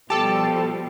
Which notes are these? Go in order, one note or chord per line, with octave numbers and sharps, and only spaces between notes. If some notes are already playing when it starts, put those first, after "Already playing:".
B2 F3 G3 G4 A4 A5